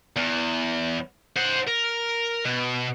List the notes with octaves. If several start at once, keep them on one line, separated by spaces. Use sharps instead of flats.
E2
C5 F#5
A#4
B2